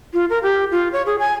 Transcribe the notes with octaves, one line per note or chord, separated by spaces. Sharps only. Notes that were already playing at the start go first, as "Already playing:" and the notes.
F4
A#4
G4
F4
C#5
G#4
G#5